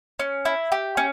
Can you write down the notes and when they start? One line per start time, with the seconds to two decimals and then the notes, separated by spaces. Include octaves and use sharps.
0.20 C#4
0.45 E4
0.72 G4
0.97 C#4